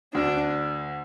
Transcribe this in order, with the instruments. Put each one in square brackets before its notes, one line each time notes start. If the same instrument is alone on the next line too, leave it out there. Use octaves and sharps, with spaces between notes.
[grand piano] D2 D3 [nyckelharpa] D4